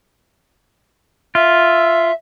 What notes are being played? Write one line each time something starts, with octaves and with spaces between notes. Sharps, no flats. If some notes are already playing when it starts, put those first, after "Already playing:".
F4 E5